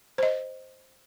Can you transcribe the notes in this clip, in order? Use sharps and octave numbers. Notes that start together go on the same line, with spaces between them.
C5 D#5